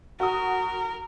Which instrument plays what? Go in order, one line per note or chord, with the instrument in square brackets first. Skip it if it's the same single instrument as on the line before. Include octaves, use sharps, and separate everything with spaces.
[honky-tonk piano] F#4 D#6 [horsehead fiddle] A#4